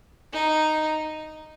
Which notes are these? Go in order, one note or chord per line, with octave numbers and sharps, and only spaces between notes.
D#4